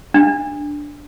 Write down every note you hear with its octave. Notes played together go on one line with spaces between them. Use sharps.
D4